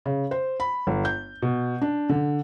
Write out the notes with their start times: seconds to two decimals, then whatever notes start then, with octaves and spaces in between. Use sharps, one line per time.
0.06 C#3
0.31 C5
0.60 B5
0.87 G1
1.05 G6
1.42 B2
1.82 D4
2.09 D3